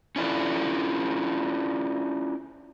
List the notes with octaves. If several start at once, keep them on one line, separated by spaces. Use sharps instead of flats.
C#4 D4 E4 F4 A4